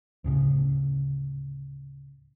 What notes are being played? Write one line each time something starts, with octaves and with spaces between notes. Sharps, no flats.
D2 A2 C#3